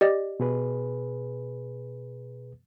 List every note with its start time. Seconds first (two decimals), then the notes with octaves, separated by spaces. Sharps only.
0.01 G4 D5 D#5
0.40 B2 G#4 B4